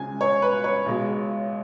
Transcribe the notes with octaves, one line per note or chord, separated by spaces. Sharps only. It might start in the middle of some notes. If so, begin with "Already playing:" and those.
Already playing: C#2 C#3 G#3 G#5 G#6
C#5 C#6
B4 B5
C#5 C#6
B1 B2 G#3